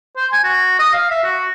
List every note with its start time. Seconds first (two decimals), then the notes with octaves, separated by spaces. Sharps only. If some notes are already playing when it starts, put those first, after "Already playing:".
0.17 C5
0.32 G#5
0.44 F#4
0.79 D#5
0.93 F5
1.10 E5
1.24 F#4